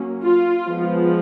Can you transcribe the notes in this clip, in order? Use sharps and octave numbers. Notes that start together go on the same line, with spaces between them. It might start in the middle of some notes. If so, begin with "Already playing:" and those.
Already playing: F#3 A#3 C#4
F4
F3 G#3 B3